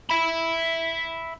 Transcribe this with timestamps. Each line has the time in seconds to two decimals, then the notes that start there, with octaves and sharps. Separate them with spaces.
0.10 E5 B5